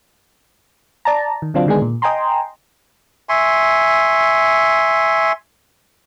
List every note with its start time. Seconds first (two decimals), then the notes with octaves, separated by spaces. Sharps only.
1.05 D5 A5 A#5
1.42 D#3
1.54 D3 F#3 C4 D4 F4
1.67 D3 D#3 G#3 B3 D4 G#4
1.82 A#2
2.02 D#5 G5 G#5 A#5 C6
3.29 E5 G#5 C6 C#6